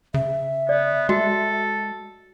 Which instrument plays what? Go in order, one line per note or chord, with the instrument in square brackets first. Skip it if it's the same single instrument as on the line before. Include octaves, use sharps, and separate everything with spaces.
[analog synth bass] C#3 [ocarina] E5
[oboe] B3 [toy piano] D5
[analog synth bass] G#3 [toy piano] F#4 [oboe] A4